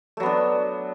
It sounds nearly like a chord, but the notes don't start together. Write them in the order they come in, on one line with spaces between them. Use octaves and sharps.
A3 F#3 B3 D4